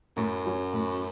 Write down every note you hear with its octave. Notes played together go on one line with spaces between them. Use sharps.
F#2 A2
F#3 C#4
A2